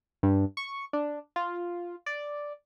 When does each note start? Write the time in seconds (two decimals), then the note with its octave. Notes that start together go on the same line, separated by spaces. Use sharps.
0.23 G2
0.57 C#6
0.93 D4
1.36 F4
2.06 D5